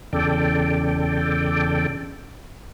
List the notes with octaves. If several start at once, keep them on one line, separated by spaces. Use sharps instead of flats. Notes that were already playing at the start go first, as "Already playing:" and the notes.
E2 C#3 A4 D5 G5